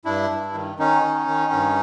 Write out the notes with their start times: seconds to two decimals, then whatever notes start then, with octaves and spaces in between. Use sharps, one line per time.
0.05 G2 D4 E4
0.30 G2
0.54 D#3
0.78 D#3 C#4 D#4
1.03 D#3
1.28 D#3
1.52 G2